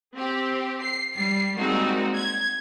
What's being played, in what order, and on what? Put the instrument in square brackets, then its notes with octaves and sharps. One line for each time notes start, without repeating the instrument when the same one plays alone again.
[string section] C4 G4
C7
G3 C7
G3 G#3 A#3 C4 D#4 F#4
G#6